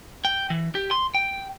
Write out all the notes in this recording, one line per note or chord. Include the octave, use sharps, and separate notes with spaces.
G5
E3
G4
C6
G5